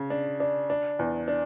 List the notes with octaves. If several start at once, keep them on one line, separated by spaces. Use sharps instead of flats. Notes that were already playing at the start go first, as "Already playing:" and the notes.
Already playing: C#3
D4
D4
D4
E2
D4